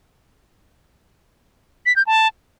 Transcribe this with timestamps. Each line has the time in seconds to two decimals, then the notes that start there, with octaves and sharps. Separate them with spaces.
1.86 B6
1.96 G6
2.07 A5